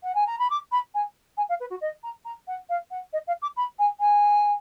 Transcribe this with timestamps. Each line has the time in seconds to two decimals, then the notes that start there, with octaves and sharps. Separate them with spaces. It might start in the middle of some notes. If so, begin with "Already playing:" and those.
0.03 F#5
0.15 G#5
0.27 A#5
0.39 B5
0.50 D6
0.72 B5
0.94 G#5
1.37 G#5
1.49 F5
1.60 B4
1.70 F#4
1.81 D#5
2.03 A#5
2.25 A#5
2.48 F#5
2.69 F5
2.91 F#5
3.13 D#5
3.27 F5
3.42 D6
3.57 B5
3.79 G#5
4.00 G#5